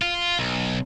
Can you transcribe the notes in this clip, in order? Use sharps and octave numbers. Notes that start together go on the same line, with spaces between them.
F4
B1